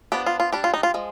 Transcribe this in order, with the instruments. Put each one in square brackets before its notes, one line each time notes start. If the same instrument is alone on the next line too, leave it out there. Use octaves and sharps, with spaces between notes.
[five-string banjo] F3 B3 D4 G4
F4
F4
G3 D4 G4
F4
D#4
F4
F3 G#3